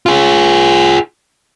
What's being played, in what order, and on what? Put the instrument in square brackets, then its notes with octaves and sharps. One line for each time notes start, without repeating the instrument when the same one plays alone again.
[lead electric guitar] F4 G#4